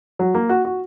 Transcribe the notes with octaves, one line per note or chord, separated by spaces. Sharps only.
F#3
A#3
F#4
F#4